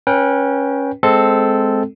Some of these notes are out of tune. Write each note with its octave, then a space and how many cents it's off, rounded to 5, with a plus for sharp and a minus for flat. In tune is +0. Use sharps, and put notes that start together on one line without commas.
C#4 -5 B4 -30 G5 +0
G#3 +10 C4 -10 A4 +0